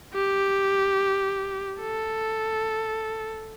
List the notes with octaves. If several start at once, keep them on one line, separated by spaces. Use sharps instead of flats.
G4
A4